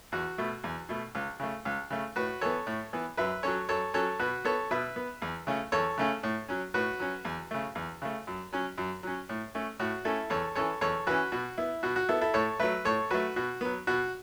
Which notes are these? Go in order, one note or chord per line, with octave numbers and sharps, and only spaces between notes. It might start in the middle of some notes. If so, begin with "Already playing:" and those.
E2 F#4
B2 A3
E2
B2 A3
C#2
C#3 A3
C#2
C#3 A3
A2 F#4 B4
E3 B3 A4 C#5
A2
E3 B3
F#2 B4 E5
F#3 C#4 A4 C#5
F#2 A4 C#5
F#3 C#4 A4 C#5
B2 F#4 B4
B3 A4 C#5
B2 B4 E5
B3
E2
C#3 A3 C#4
E2 A4 C#5
C#3 A3 C#4
A2
F#3 C#4
A2 F#4 B4
F#3 C#4
E2
C#3 A3
E2
C#3 A3
F#2
F#3 C#4
F#2
F#3 C#4
A2
A3 C#4
A2 F#4
A3 C#4 E4 A4
E2 A4 C#5
E3 C#4 A4 C#5
E2 A4 C#5
E3 C#4 F#4 B4
B2 F#4
B3 E4
B2 F#4
F#4
B3 E4 A4
E4 A4
A2 A4 C#5
F#3 A3 B4 E5
A2 A4 C#5
F#3 A3 F#4 B4
B2 F#4
F#3 B3
B2 F#4